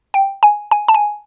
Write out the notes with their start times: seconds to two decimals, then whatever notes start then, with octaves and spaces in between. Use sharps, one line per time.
0.14 G5
0.43 G#5
0.71 G#5
0.88 A5
0.94 G#5